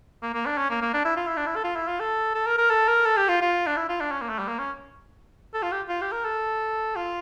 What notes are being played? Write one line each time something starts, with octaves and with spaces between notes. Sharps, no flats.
A#3
A#3
D4
C#4
A#3
A#3
D4
E4
F4
E4
D4
E4
A4
F4
E4
F4
A4
A4
A#4
A#4
A4
A#4
A4
G4
F4
F4
D4
E4
F4
D4
C#4
A#3
A3
G3
A#3
C#4
A4
F4
G4
F4
G4
A#4
A4
F4